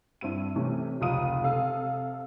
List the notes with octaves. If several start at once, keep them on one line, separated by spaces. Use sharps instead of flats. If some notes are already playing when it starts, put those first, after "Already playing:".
G2 C4 E4 D#7
C3 E3 A3 C#4
F1 C#2 F4 D#6 D#7
C3 A4 F5 E6